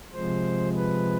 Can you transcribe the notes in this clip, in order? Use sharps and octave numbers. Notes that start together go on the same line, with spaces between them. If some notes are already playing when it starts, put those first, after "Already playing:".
C3 F3 G#3 C5
B4